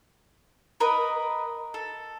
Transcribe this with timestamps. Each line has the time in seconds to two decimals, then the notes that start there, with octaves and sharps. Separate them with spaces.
0.80 A#4 B4 D#5
1.74 A4